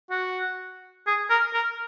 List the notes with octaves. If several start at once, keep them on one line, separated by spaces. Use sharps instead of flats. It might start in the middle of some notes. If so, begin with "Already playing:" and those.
F#4
G#4
A#4
A#4